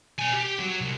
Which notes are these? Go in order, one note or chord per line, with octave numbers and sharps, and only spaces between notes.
B2 G#5
G4
F#3
C2